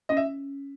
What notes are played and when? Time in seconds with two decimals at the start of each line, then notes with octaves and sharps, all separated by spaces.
0.09 C#4 D#5
0.17 E5